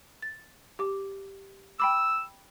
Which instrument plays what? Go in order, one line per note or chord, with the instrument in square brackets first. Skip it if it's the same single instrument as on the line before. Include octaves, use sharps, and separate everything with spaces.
[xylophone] A6
G4 D6
[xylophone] G5 B5 D6 [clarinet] E6